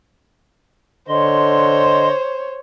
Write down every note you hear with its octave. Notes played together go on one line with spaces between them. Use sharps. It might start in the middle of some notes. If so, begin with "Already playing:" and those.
D3 C5 C#5 D#5 C6